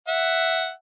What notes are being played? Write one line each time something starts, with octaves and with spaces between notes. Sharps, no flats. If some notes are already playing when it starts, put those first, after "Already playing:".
E5 F#5